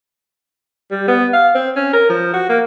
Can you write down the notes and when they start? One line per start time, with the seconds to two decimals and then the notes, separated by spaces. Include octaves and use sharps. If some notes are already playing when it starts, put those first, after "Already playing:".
0.91 G3
1.08 B3
1.33 F5
1.55 C4
1.76 C#4
1.93 A#4
2.09 F3
2.34 F#4
2.49 A#3